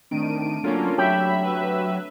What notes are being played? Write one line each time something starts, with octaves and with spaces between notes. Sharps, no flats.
D#3 A3 C4 D4 D7 D#7
F#3 A#3 C#4 D4 F4 A4
F#3 G4 C#5 E5 B5
B4 E5